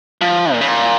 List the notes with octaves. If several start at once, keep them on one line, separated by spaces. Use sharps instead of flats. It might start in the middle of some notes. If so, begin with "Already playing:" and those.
F3
A#2
C#3
A#2